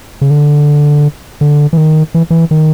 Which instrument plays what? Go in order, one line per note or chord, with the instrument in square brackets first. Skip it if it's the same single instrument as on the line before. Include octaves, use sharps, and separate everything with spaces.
[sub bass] C#3
D3
D3
E3
D#3
E3
E3
D#3